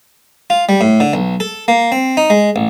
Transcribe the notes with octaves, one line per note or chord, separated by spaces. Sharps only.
F4
G3
A2
D3
B1
A4
A#3
C4
D#4
G#3
A1